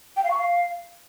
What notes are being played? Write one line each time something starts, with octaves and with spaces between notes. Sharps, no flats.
G5
F5
C#6
F5